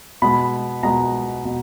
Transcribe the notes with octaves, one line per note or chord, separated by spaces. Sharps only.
B2 G#3 B5
B2 G#3 A#5
B2